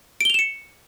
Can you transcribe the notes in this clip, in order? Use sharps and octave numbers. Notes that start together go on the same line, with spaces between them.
C#7 D7 E7 F7 G7